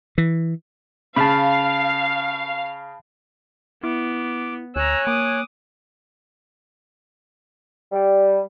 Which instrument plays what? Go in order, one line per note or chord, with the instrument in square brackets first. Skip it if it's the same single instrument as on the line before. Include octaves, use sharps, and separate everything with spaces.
[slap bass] E3
[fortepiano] C#3 [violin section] F5 [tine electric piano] A5 B5
[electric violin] B3 [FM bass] E4 [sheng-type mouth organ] D6
[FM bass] D2 [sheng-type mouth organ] C#5 G#5 F#6 [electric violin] A#5 E6
[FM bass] A#3 [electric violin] D6 D#6
[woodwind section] G3